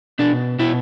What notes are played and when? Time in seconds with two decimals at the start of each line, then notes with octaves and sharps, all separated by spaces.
0.19 B2 D4
0.59 B2 E4